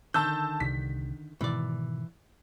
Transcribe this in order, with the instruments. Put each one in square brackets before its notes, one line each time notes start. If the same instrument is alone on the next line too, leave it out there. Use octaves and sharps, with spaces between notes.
[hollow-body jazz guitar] D3 D#3 [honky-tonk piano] A5 E6 G6
[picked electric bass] C2 C3 D4 [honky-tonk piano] B6
[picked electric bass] G#2 B2 D#3 [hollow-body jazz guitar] E3 D5